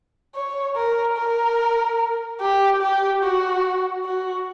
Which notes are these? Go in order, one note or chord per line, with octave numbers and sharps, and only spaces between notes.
C#5
A#4
A#4
G4
G4
F#4
F#4